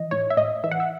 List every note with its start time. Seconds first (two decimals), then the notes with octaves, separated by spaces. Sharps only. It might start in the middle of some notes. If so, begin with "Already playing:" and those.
Already playing: E3 D#5
0.11 A2 C#5
0.30 E5
0.37 A2 D#5
0.64 E3 E5
0.71 F#5
0.80 E5